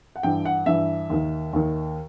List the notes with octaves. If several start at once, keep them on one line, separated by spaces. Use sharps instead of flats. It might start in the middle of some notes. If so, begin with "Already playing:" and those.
F#5
G2 E3 G5
F#5
G2 E3 E5
D#2 D#3
D#2 D#3